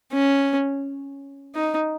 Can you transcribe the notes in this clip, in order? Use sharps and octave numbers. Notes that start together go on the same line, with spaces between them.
C#4
D#4